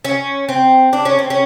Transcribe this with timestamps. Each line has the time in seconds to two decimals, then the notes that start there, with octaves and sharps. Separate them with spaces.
0.05 C#4
0.49 C4
0.93 D4
1.05 C#4
1.19 C4
1.30 C#4